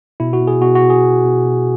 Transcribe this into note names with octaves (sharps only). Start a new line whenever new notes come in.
B2 E4
F#4
B2
G#4
B2 F#4
F#4
B2
G#4
B2
B2
B2